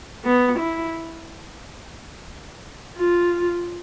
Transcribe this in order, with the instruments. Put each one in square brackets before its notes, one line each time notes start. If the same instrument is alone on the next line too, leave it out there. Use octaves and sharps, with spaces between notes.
[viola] B3
E4
F4